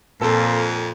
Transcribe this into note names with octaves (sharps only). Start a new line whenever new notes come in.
F2 A#2 A4